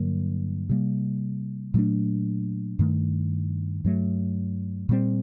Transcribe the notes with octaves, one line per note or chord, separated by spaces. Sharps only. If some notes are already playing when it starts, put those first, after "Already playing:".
Already playing: G2 D3 F#3 A#3
C3 G3 A#3
A#2 F#3 A3 D4
G2 D#3 A3
G2 F#3 A3
A#2 G3 C4